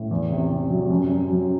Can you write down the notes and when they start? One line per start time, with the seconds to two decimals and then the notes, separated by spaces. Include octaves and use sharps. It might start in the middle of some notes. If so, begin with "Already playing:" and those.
Already playing: A2
0.11 E2
0.31 C3
0.50 C3
0.70 F#3
0.90 F#2
1.10 F#2
1.29 F#3